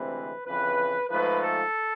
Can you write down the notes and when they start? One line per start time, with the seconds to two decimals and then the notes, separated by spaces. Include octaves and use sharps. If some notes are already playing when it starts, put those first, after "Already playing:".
Already playing: D2 C3 E3 G#3 C4 B4
0.46 F2 C#3 E3 B4
1.10 G#2 F3 A3 B4
1.42 A4